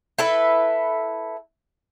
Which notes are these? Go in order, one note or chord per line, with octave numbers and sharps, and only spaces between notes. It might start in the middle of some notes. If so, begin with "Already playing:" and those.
E4 A4 B4 E5